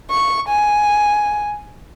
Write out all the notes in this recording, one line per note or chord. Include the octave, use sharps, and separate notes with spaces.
C#6
G#5